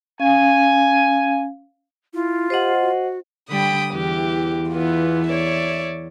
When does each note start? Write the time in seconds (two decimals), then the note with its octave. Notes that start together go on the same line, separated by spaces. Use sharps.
0.20 C#4 F5 G#5
2.14 E4 F4
2.50 G4 C5 D#5 F#5
2.82 F#4
3.49 D3 G3 G5 B5 D#6
3.93 E2 E3 G4
4.70 E3 B3 F4
5.28 C#5 D5 E5